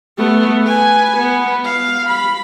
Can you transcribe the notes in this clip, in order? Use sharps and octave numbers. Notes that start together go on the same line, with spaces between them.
A3 B3
B4 G#5
B3
F5
B5